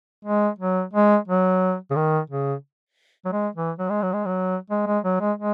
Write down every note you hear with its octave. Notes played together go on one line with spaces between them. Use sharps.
G#3
F#3
G#3
F#3
C#3
D#3
C#3
F#3
G#3
E3
F#3
G#3
F#3
G#3
F#3
G#3
G#3
F#3
G#3
G#3